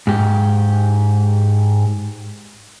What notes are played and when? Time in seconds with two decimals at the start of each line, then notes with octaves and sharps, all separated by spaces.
0.07 G#2 G4